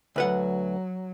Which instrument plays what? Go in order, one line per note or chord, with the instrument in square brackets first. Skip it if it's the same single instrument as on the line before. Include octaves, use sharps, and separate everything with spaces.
[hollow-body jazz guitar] D2 B4 F#5 [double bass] F#3